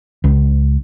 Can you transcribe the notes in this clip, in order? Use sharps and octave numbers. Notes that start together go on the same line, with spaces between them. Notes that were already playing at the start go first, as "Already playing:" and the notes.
C#2